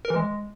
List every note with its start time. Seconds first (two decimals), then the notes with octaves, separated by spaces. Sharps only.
0.05 A#4
0.10 E3
0.16 G#3